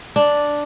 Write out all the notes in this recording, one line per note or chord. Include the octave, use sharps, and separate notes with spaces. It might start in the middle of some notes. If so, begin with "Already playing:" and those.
D4